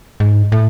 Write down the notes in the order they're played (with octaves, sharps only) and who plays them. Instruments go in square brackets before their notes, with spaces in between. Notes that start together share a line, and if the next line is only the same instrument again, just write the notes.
[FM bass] G#2
A2